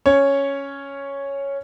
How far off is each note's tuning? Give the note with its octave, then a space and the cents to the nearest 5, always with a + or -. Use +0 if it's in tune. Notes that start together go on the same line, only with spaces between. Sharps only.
C#4 +0 C#5 +0